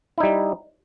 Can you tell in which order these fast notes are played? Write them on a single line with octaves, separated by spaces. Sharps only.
E4 D#4 G3